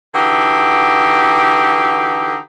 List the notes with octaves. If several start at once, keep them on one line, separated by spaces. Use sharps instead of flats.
D3 E3 D#4 F#4 G4